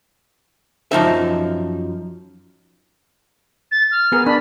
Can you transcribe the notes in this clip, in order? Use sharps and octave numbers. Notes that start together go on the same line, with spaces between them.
F#2 F3 D#4 E5
A6
F6
B3 G#4 A#4
D4 B5